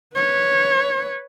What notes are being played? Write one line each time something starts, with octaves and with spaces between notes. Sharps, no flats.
B4 C#5